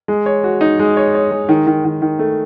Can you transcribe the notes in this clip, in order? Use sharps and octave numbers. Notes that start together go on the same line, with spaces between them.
G#3
C#5
F#4
D#4
G#3
C#5
C#5
G#3
D#3
D#3
D#3
D#3
A3